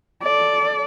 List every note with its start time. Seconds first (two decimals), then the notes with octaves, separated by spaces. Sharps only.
0.23 A4 D5